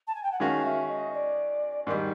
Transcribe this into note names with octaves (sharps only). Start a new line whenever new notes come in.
A5
G#5
G5
F#5
D#3 G#3 C#4 F#4 F5
E5
D#5
D5
G#2 D#3 G3 D#5